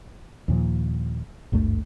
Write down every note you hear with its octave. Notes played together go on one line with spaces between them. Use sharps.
D#2 A#2 F3
G#1 D2 G2 A3